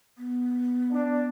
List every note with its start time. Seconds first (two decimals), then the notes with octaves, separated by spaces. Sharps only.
0.18 B3
0.93 D4